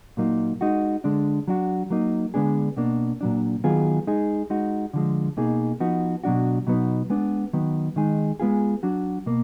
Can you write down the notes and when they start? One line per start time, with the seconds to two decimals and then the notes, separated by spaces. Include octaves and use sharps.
0.17 A#2 F#3 A#3 D#4
0.61 G#3 D#4 F#4
1.04 D3 G#3 D4
1.48 F#3 D4 F#4
1.90 F#3 A#3 D#4
2.34 D3 G#3 B3 D4 G#4
2.77 B2 A#3 D4
3.21 A#2 F#3 D4
3.64 D#3 F#3 B3 F4 G#4
4.07 G#3 D#4 G#4
4.50 G#3 D#4 F#4
4.94 D3 F3 G#3
5.37 B2 A#3 D#4 G#4
5.80 F3 B3 D#4 F#4
6.24 B2 F#3 D4 F#4
6.67 B2 F#3 B3 D#4
7.10 G#3 B3 D4
7.53 D#3 F#3 B3
7.96 D#3 G#3 D#4 G#4
8.40 G#3 B3 F4 G#4
8.83 F#3 D4 F#4
9.26 B2 A#3